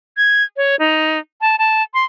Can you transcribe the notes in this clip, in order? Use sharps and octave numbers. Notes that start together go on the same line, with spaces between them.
G#6
C#5
D#4
A5
A5
C6